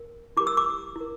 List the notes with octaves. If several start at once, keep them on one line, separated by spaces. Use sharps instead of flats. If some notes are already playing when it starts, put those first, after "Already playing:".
Already playing: A#4
E4 G4 A#4 D6
E6
D6
E4 A#4